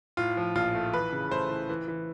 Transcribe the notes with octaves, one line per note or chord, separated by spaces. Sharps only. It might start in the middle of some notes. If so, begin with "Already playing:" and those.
A2 F4
F3
A#1 F4
A3
E3 B4
C#3
A3 C5
E3
E3
E3